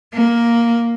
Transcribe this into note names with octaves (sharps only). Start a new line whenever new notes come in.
A#3